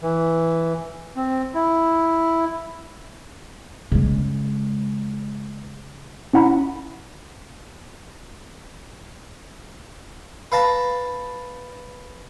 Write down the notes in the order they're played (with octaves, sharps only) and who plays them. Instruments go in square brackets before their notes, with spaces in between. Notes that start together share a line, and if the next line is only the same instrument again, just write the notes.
[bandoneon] E3
C4
E4
[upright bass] C#3 G#3
[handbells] C#4 E4 F#5 A#5 B5
[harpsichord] B4 F5 A5 A#5